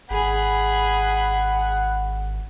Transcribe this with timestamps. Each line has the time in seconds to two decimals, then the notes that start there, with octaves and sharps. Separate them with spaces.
0.10 G#1 G#4 F#5 B5